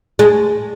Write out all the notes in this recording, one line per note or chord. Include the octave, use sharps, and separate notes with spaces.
G#3